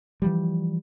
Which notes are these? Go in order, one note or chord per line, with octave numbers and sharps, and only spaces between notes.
E3 F3 G3